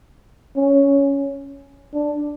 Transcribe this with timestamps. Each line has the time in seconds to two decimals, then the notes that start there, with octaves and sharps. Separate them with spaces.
0.56 C#4
1.94 D4